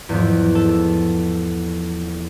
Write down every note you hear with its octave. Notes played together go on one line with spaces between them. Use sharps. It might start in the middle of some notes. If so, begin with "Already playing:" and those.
E2 G#2 F3
A4